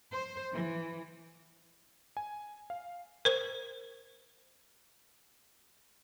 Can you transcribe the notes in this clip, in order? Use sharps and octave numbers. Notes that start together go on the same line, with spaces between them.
C5
E3
G#5
F5
A#4 C5